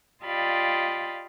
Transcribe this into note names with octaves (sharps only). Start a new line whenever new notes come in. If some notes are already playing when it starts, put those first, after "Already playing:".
F4 G4 D5 D#5 F5 B5